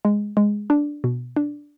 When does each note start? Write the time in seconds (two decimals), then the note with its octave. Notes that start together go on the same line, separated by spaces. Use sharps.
0.05 G#3
0.37 G#3
0.70 D4
1.04 B2
1.37 D4